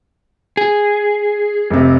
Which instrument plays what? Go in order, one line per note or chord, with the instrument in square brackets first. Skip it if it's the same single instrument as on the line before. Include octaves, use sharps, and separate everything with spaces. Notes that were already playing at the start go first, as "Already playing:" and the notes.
[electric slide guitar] G#4
[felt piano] F1 C3